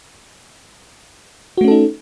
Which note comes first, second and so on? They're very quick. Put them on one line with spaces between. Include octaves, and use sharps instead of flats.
F#4 A3 C#4 A4 D#4